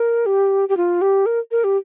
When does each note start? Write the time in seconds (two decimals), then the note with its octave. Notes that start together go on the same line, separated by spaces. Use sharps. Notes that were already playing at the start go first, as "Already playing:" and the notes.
Already playing: A#4
0.26 G4
0.69 G4
0.77 F4
1.01 G4
1.26 A#4
1.51 A#4
1.64 G4